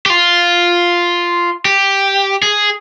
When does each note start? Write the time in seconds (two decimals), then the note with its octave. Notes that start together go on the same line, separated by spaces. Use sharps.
0.06 G4
0.10 F4
1.65 G4
2.43 G#4